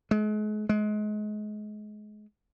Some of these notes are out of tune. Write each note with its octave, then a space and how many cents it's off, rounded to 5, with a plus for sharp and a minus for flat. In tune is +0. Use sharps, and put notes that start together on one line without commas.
G#3 +40
G#3 +30